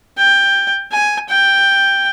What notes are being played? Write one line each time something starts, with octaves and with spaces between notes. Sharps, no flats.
G5
G#5
G5